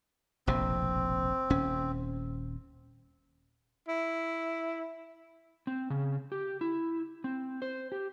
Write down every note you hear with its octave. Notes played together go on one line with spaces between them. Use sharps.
F1 A#1 B2 C4
D#1 C#4
E4
C4
C#3
G4
E4
C4
C5
G4